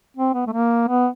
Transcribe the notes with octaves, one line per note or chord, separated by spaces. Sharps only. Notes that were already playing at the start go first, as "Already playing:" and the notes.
C4
B3
A3
A#3
B3